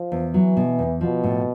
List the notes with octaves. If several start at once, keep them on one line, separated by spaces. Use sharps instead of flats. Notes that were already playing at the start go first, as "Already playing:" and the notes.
Already playing: F3
E2
E3 F#3
B2
E2
B2 F3
A2